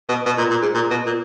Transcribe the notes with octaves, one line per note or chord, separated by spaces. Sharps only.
B2
B2
A#2
A#2
G#2
A#2
B2
A#2